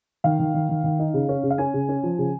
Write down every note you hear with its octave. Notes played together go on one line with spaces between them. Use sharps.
D#3 F5
D#3
D#3
D#3
D#3
D#4
C#3
C#4
C#3
F5
C#4 G#5
C#3
C#4
F3
C#3